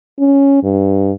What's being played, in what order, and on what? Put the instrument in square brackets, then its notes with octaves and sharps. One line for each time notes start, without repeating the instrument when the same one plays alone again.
[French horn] C#4
G2